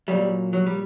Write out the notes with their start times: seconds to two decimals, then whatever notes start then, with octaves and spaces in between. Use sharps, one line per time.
0.08 A#2 F#3 G3
0.53 F#3
0.66 G3